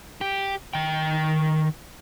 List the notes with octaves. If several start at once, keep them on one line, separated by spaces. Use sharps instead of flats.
G4
D#3 G5